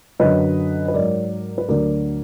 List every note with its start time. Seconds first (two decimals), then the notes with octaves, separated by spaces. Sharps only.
0.20 F#2 D3 F#3 B4 D#5
0.88 B4
0.94 G#2 F#3 A#4 D5
1.58 B4
1.69 D2 D3 F#3 A#4 D5